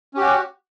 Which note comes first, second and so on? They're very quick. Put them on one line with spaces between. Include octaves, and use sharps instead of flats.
C#4 G4 F#4